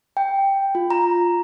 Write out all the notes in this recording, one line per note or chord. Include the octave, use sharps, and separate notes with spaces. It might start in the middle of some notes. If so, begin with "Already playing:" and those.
G5
F4
A#5